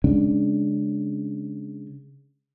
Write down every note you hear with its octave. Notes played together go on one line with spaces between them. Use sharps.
C#3 G#3 C#4 D4